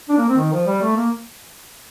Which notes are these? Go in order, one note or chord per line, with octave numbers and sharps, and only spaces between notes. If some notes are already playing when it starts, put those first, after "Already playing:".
D4
A#3
C4
D#3
F3
G3
A3
A#3